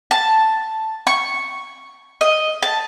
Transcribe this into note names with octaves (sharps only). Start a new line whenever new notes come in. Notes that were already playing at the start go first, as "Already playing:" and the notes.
A5
C#6
D#5
A5